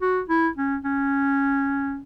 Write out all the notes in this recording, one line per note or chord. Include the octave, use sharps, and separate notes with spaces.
F#4
E4
C#4
C#4